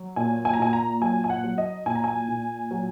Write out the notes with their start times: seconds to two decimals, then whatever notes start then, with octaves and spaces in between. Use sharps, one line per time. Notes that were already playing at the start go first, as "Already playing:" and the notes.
Already playing: F#3
0.16 A#2 G#5
0.45 G#5
0.53 A#5
0.59 A#2 G#5
0.73 A#5
1.01 F#3 G#5
1.24 G#5
1.30 F#5
1.44 F#3
1.58 D#5
1.86 A#2 G#5
1.95 A#5
2.04 G#5
2.28 A#2
2.71 F#3